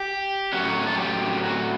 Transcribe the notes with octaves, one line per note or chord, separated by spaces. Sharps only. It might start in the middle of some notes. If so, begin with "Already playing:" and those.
Already playing: G4
A2 F#3 C#4 F#4
A4
G4
F#4